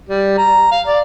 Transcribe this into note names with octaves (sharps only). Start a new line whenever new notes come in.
G3
A#5
F5
D5